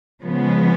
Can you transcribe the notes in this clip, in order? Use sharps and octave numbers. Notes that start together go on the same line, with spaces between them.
C#3 F3 G#3 B3